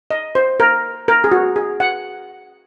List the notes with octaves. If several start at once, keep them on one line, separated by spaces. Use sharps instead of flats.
D#5
C5
A#4
A#4
G#4
F#4
G#4
F#5